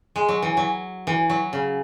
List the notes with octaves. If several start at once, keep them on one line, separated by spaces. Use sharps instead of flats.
G#3
F#3
E3
F#3
E3
F#3
C#3